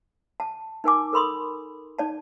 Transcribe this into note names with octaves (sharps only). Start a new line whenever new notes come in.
A5
D#4 A#4 G#5 D6
A4 A#4 B5 C6 D#6
D#4 D5 A5